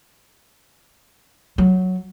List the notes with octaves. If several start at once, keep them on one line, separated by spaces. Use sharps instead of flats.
F#3